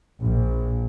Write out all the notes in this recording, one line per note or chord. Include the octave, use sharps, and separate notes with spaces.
A#1